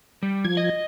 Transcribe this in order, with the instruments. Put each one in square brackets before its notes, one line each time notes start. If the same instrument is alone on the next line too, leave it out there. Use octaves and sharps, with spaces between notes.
[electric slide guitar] G3
[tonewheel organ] F3 G#6
[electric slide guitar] D#5